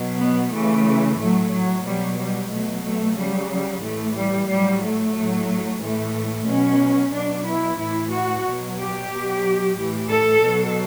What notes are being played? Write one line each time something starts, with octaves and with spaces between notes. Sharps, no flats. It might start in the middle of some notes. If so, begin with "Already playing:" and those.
Already playing: B2 F#3
B3
C#3 E3 A3
A2 F#3 A3
F#3
B2 F#3 G3
G3
B2 F#3 A3
A3
C#3 F#3 G3
G3
A2 E3 A3
G3
A2 F#3 G3
A3
A2 F#3
A2 E3 A3
B2 F#3 C#4
B2 F#3 D4
E4
A2 E3 E4
F#4
B2 F#3
G4
B2 F#3
A2 E3
A4
B2 F#3